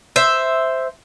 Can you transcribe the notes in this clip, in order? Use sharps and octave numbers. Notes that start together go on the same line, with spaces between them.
C5 E5